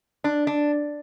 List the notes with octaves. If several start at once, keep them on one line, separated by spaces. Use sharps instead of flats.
D4
D4